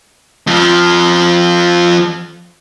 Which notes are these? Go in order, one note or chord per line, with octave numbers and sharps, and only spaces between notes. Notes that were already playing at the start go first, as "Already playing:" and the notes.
F2 F3